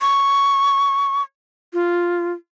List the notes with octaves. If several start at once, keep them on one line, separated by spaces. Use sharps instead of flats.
C#6
F4